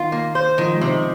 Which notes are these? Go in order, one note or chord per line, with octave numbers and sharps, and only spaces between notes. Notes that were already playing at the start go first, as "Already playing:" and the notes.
Already playing: D#3 F4
A#3
C5
D#3 F3
G#3
C3
D#4